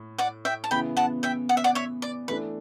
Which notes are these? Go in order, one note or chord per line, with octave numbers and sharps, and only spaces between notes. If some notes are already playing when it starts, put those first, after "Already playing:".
Already playing: A2
D5 F#5
E5 G5
A5
C#3 E3 B3 G5 B5
F#5 A5
E5 G5
F#5
E5
D5 F#5
C#5 E5
D5
E3 A3 D4 B4